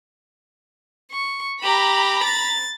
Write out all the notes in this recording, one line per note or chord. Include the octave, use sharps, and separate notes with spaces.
C#6
G4 A#5 B5
A6